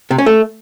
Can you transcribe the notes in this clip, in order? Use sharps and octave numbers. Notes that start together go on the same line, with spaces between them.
C3
C#4
A3